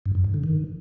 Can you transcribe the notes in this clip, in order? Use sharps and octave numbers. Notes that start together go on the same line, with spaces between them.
G2
F#2
G#2
D3
D#3